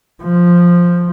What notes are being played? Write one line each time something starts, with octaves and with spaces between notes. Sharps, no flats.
F3